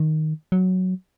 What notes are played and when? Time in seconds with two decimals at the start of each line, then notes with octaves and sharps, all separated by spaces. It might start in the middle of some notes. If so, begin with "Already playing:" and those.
Already playing: D#3
0.52 F#3